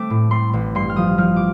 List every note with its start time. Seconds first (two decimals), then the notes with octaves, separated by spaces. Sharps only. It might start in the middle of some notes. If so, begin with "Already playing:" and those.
Already playing: A3 C4 D6
0.10 A2
0.31 A3 C6
0.53 A1 C6
0.75 G2 C6
0.90 F6
0.96 F3 D#6
1.18 F3 F6
1.36 D6